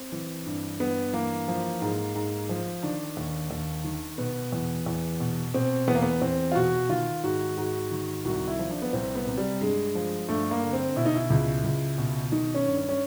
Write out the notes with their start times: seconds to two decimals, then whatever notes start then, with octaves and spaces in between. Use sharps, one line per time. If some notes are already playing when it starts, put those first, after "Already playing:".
Already playing: C4
0.12 E3
0.46 G2
0.80 G2 B3
1.13 E3 A#3
1.48 F3
1.82 G#2
2.15 G#2
2.49 F3
2.83 D#3 D4
3.17 D#2
3.51 D#2
3.84 D#3
4.18 B2 B3
4.52 E2
4.86 E2
5.20 B2
5.54 B2 C4
5.88 E2 B3
5.95 A#3
6.02 B3
6.22 E2 C4
6.52 F4
6.55 B2 F#4
6.89 D#3 F4
7.24 G#2 F#4
7.57 G#2 F#4
7.91 D#3
8.25 C2 F#4
8.48 E4
8.59 F3
8.71 D4
8.82 B3
8.93 C2 C4
9.15 B3
9.27 C3
9.38 G3
9.61 G2 G#3
9.95 F3
10.28 G2 A3
10.51 A#3
10.62 D3
10.73 C4
10.96 B2 E4
11.05 D#4
11.15 E4
11.30 C#2
11.64 C#2
11.98 B2
12.32 D#3 D#4
12.54 C#4
12.66 G2
12.77 C#4
12.89 C#4